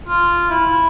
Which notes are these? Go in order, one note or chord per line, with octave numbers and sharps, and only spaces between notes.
F4
E4